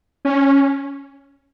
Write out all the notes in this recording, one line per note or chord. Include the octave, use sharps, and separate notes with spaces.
C#4